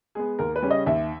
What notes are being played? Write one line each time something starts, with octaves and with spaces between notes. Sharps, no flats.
G#3 B3 G#4
D#2 A#4
B4
C#3 G3 C#4
D#5
D#2 E5